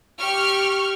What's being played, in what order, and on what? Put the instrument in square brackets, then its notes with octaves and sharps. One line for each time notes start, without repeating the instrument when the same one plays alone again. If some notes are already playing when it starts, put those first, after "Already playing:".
[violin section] G4 C#6 F6